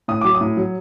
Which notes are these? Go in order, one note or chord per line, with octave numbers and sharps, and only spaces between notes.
A2 D#6
F#3 D6
D#6
A2
F#3